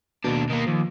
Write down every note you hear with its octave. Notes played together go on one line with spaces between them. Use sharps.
D#2 B2 D4
D#3 A#3
D#2 F3